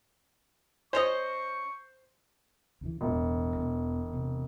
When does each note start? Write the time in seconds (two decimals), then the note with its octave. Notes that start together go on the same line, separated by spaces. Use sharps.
0.93 C#4 C5 C#5 D#5 C#6
2.81 D2 C#3 E3
3.01 E1 A1 B2 A3
3.56 E2 B2
4.13 C3